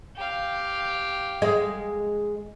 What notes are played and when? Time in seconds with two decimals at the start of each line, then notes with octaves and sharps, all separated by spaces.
0.16 G4 F5
1.42 G#3 G#4 D#5